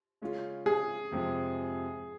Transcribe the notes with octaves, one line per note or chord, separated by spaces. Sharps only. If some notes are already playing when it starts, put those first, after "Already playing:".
C#3 G#3 C#4 F4
G#4
F2 C3 F3 G#3